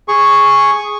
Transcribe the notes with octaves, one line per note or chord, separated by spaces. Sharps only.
G#4 C#6